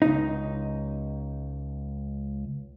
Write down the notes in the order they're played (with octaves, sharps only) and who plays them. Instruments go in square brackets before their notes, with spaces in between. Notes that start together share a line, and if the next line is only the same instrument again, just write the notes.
[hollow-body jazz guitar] C#2 D#4